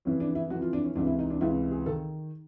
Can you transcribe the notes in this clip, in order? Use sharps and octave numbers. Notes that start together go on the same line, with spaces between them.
F2 C#3 E3 C#4
D4
E4
F2 C#3 E3 F#4
F4
D4
C#4
C#2 C3 E3 D4
E4
D#4
D4
C#2 C3 E3 E4
G#4
D#3 A4